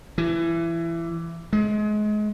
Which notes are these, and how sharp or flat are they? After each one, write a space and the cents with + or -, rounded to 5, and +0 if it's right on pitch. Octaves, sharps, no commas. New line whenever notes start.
E3 +20
G#3 +30